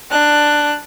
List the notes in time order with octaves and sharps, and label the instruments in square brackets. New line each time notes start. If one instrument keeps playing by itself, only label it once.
[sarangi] D4 [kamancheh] F#6